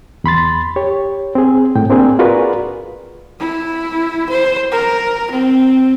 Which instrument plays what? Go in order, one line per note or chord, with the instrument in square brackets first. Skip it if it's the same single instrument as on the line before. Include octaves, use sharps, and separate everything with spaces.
[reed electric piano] E2 B5 C6 A6
G4 C#5
C4 G#4
A2 G5
A#3 C4 D4 G#4
F4 F#4 G#4 A#4 B4 D5
[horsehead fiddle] E4
C5
A#4
C4